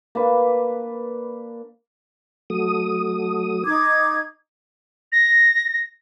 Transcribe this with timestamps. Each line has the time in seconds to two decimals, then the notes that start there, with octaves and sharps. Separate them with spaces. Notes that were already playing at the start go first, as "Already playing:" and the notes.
0.15 A#3 D4 B4
2.50 F#3 A3 D#6
3.65 D#4 D6 G#6
5.12 A#6